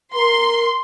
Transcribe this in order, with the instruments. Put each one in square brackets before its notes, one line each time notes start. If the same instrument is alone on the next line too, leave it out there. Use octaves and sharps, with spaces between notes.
[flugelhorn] A#4 [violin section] C6